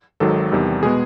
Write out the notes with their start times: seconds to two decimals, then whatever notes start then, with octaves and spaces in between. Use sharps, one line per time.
0.20 G#1 G#2 D#3 F#3 A4
0.52 E2 C3 D#3 G3
0.83 B2 G#3 B3 G#4